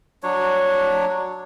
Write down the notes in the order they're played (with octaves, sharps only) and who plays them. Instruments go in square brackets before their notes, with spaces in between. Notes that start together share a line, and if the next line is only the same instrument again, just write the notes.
[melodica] F#3 D4 C#5